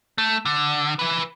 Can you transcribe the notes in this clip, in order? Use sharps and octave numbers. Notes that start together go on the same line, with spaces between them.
A3
D3
E3 B4